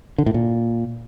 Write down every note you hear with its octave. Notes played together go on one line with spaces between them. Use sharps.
D3
A2
A#2